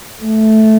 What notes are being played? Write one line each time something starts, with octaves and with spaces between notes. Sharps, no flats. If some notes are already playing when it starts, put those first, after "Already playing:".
A3